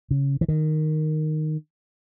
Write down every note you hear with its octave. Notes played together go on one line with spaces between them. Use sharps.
C#3
E3
D#3